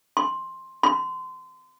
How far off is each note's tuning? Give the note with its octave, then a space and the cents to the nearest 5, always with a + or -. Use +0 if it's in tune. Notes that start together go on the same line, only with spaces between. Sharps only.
C6 +10
C6 -25